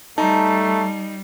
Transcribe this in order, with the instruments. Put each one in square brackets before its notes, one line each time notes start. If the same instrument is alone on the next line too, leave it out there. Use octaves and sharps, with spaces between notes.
[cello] G3 [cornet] A3 [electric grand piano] D#4 [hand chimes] A5 A#5